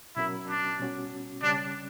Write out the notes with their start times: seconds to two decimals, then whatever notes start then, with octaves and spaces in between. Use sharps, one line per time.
0.17 B2 F#3 C#4 E4 F#4 A#4
0.48 D4
0.79 B2 G3 C#4 F#4
1.42 C#3 G3 C#4 D4